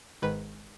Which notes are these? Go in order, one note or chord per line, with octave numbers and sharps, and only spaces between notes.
G#1 G#2 D#3 B4